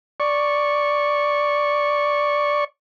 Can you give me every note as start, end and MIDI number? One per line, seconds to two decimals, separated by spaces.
0.20 2.64 74
0.20 2.64 85